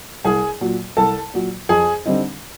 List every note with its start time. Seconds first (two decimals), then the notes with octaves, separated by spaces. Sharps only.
0.24 C2 G#4 G#5
0.61 A#2 F#3
0.97 C2 A4 A5
1.34 A#2 F#3
1.69 F2 G#4 G#5
2.06 D3 G3 C4 D#4